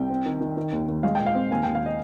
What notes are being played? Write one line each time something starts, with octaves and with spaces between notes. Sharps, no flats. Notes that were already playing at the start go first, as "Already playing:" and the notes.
Already playing: C2 G5
C4
D#3
D#3
D#3
D#2
D#2
G#3 F5
A#2 G5
F5
C4
D#2 G#5
D#2 G5
F5
D#5